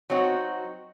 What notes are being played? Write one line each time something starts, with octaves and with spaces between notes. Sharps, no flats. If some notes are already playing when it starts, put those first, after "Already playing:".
F#3 C4 D#4 F#4